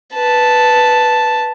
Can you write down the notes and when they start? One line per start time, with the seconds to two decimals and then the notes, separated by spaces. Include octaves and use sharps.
0.14 B4 A5